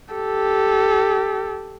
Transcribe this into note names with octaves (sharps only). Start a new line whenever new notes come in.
G4 A4